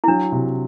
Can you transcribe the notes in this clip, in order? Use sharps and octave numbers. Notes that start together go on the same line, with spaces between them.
E4
F#3 D4
C3